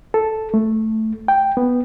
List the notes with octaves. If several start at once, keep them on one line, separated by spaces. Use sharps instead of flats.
A4
A3
G5
B3